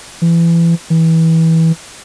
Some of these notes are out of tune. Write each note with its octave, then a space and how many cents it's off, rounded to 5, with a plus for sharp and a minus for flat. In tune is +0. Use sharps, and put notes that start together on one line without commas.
E3 +30
E3 -20